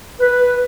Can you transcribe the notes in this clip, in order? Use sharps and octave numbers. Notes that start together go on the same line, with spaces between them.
B4